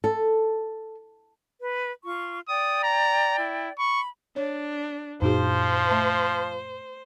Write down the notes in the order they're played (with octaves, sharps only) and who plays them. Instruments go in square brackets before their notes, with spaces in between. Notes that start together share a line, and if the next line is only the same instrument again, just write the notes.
[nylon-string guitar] A4
[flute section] B4
F4 C#6
[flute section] D5 G5 [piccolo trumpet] D#6
[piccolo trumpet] A#5
E4
[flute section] B5 [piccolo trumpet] C#6
[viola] D4 [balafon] C#5
[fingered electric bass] F#2 A#2 D4 [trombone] F3 [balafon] D#4 F#4 G#4 [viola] C5
[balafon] A3 A5